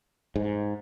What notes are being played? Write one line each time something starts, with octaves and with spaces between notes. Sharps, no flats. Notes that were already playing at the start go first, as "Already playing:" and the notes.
G#2